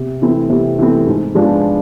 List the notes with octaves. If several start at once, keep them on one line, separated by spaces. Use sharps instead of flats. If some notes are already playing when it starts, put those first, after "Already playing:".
Already playing: C3
E3 A3 C4
C3
E3 A3 C4
G#2
F3 G#3 B3 D4